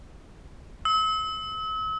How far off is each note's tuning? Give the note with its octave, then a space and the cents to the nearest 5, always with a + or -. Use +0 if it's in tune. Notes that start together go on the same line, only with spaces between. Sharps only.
E6 -40